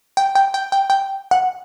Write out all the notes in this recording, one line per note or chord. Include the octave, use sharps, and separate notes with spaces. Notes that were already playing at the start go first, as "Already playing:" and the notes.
G5
G5
G5
G5
G5
F#5